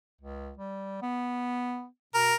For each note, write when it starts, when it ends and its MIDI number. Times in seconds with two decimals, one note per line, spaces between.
0.21 0.53 37
0.57 0.98 55
1.02 1.86 59
2.14 2.33 47
2.14 2.34 70